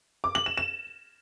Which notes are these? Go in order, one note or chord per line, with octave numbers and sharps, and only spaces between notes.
D6
F#7
E7
E7